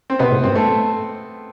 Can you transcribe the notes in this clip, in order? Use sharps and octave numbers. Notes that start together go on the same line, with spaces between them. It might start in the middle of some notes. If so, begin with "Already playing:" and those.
C4
C3 B3
A2
G2 C4
A3